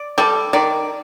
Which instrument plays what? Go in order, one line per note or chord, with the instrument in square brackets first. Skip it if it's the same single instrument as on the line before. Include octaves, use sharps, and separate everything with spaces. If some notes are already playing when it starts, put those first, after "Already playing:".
Already playing: [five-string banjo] D5
[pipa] G3 [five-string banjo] A4
[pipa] D#3 [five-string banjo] D5